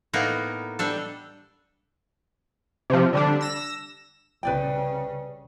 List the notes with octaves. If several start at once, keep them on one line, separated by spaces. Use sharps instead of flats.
A2 A#3 B3 D#4
G3 D4 A4
C3 F3
D3 G3 D4
E6 A#6 E7
C2 C#3 B4 D5 G5